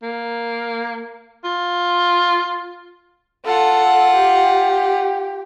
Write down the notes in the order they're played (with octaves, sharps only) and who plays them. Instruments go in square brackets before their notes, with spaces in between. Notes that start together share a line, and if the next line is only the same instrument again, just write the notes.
[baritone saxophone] A#3
F4
[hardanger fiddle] F4 F#5 [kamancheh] A4
[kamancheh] G4